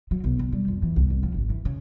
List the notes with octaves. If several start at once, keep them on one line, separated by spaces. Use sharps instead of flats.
F#3
B1
D3
G3
F2
E3
C2
C2
F3
G#1
E3
C#3